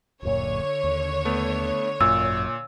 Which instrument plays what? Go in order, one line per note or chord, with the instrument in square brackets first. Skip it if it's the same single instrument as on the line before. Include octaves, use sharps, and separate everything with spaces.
[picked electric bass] D1 F#2 A#2 [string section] D3 C#5
[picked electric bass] D#2
[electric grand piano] A3 B3
[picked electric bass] G#1 F#2 [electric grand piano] A#2 [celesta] E6